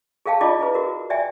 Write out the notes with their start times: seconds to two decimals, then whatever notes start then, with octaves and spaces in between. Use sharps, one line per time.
0.26 G#4 A4 F5 G5 A5
0.41 E4 F4 D5 D#5 A5 D6
0.60 E4 G#4 B4
0.74 F#4 A#4
1.10 D5 E5 G5 G#5